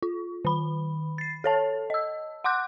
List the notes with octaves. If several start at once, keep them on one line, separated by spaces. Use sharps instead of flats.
F4
D#3 B5
A6 C7
A4 C#5 A5
D#5 E6
F#5 C6 D6 F#6 G6